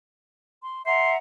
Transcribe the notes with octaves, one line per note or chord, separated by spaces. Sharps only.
C6
E5 F#5 A#5 C6